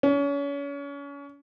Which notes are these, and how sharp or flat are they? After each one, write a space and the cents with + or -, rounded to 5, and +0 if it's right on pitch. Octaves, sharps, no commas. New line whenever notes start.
C#4 +35